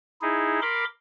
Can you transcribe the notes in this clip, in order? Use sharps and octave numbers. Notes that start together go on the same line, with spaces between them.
D#4 E4 G#4
A#4 B5 C6 D6